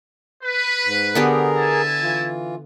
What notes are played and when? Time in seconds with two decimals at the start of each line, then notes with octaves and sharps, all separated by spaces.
0.43 B4
0.85 G#2
1.15 D3 B3 G4 G#4 A#4 A#5
1.56 E4 G#5 A5
2.02 E3 F4